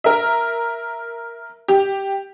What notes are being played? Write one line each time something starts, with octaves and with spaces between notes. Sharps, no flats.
A#4 E5
G4